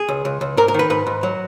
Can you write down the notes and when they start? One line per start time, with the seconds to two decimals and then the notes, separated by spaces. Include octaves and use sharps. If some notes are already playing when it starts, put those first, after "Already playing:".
Already playing: G#4
0.09 C#2
0.25 C#2
0.41 C#2
0.57 G#2 A#4
0.68 A#4
0.74 D#3 B4
0.90 G#2 B4
1.07 G#2
1.23 F#3